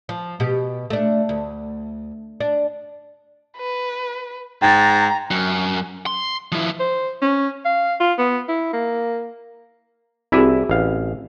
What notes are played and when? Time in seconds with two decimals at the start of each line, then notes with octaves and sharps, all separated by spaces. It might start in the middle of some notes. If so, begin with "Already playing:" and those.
0.09 F3
0.40 B2 G4
0.90 A3 D4
1.29 D2
2.40 D4
3.57 B4
4.62 G#2 G5 A#5 A6
5.31 F#2
6.06 C6
6.52 F3 E4
6.80 C5
7.22 C#4
7.65 F5
8.00 F4
8.19 B3
8.49 E4
8.73 A#3
10.32 C2 C4 E4 F#4 G#4 E5
10.70 A1 F5